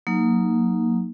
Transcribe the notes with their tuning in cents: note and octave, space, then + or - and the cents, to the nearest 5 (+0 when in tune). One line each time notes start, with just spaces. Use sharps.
F#3 -20 A#3 +0 D#4 +0